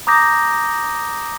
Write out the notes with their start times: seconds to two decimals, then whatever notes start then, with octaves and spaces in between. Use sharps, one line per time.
0.07 A#5 D6 D#6 G6 A#6